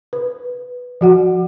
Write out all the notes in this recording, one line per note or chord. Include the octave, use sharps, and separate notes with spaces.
B4
F3 F#4 F#5